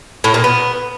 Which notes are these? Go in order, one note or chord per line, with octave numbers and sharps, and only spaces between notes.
A2
A#2
B3